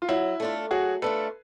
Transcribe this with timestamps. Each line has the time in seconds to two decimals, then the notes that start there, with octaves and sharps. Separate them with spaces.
0.02 F4
0.08 F#3 E4
0.40 A3 D4 F4
0.71 F#3 F#4 G#4
1.02 A3 D4 F4 A4 B4